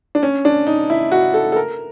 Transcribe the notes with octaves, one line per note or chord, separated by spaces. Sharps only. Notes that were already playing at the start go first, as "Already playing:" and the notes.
D4
C#4
D4
D#4
E4
F#4
A4
A4
A#4